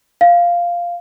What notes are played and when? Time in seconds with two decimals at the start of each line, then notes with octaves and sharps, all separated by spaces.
0.21 F5